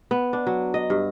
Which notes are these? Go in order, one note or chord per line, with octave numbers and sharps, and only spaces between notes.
B3
D4
F#3
D#5
G2